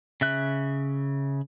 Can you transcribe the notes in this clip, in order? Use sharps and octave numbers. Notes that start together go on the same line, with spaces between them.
C#3 E5 F#6